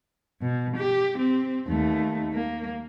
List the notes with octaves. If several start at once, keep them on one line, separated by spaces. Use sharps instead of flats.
B2
G4
C4
D#2 A3
A#3